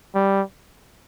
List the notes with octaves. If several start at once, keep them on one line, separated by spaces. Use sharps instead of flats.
G3